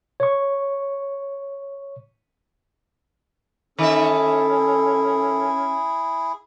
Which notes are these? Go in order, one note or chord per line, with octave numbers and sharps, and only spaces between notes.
C#5 C#6
D#3 C#4 E4 G#4 A4 E5